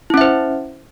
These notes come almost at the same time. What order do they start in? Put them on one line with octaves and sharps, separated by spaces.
E4 C#4 E5 C5